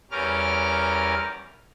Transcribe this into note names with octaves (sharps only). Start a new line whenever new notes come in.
E2 G3 C#4 A#4 D6 F6